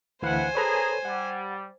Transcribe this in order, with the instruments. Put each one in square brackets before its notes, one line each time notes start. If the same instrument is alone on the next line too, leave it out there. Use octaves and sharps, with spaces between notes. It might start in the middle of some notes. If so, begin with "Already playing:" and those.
[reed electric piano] D2 E3 F5 [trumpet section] A3 B4 F#5 [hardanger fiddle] C5 G#5
[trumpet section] G#4 A#5 [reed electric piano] A4 B4 C#5
[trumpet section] G3 [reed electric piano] F#5